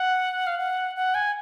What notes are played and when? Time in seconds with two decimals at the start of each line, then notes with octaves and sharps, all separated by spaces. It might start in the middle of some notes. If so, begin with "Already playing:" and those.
Already playing: F#5
0.47 F5
0.58 F#5
0.96 F#5
1.15 G#5